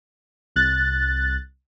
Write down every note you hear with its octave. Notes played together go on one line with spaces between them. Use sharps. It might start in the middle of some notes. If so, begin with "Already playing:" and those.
C2 F#6 A6